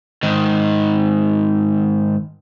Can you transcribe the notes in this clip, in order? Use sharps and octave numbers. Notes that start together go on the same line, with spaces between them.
G#2 D#3